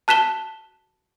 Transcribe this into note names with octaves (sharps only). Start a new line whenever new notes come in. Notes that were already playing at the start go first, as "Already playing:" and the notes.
A5 F#6 B6 E7 G7